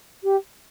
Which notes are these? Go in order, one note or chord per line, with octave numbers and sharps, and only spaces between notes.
G4